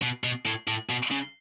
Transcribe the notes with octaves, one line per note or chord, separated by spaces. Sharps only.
B2
B2
A2
A2
B2
C#3